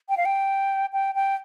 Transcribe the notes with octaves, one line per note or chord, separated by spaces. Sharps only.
G5
F5
G5
G5
G5